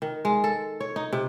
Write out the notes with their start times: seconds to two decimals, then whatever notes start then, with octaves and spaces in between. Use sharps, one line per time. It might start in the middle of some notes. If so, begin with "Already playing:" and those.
0.02 D#3
0.25 G#3
0.44 A4
0.80 C#5
0.96 D#4
1.13 C3